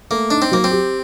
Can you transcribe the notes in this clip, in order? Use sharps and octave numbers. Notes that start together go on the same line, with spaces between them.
A3 A#3
D4 D#4
C4
F#3 A#3
C4
G4